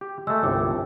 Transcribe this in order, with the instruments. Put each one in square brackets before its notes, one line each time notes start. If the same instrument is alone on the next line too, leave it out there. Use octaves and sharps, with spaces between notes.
[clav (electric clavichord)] G4
[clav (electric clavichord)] G#3 A3 [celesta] E6
[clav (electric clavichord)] G1 C2 [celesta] F4 G5 D6